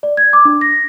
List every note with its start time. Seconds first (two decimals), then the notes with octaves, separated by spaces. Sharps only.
0.03 D5
0.17 G#6
0.33 D6
0.45 D4
0.61 A#6